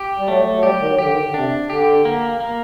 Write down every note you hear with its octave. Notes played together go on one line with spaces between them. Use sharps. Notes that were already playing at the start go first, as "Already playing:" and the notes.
Already playing: G4
G3
F#3 A3
F#3
G3 G4
D#3
F#3
D3 G4
D#3
D3
C3 D4
D3 G4
A#3
A#3